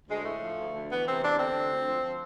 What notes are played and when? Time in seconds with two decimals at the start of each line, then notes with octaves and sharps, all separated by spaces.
0.08 D2 G#3
0.25 A2 A3
0.41 F3
0.57 D2
0.73 D2
0.89 E3 B3
1.05 C3 C4
1.21 E2 D4
1.38 D3 C4
1.54 D2
1.71 D2
1.87 F3
2.03 F3